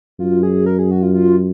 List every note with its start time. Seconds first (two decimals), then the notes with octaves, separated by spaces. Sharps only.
0.19 F#2 F4
0.43 G#4
0.66 A#4
0.79 G#4
0.91 F#4
1.03 F4
1.14 F4